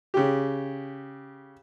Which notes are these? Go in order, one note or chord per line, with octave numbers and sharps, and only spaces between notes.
C#3 G4